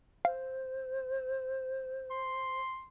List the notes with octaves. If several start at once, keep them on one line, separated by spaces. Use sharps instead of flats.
C5 F5
C6